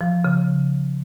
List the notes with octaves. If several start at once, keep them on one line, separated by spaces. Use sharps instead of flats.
F3
C#3